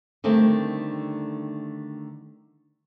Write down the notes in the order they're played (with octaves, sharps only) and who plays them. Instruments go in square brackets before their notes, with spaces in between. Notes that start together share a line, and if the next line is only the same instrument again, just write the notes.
[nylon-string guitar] D3 D#3 G3 A3 C4 D4